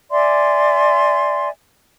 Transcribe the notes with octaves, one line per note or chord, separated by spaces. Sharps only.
D5 E5 G#5 C6